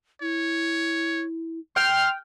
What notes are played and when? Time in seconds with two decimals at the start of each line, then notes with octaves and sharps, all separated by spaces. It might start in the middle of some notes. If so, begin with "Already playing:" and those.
0.21 E4 C#5
1.76 G5 C6 F6